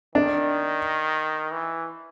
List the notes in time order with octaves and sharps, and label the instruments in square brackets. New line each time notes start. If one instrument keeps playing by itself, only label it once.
[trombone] D#3 [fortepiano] D4
[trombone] E3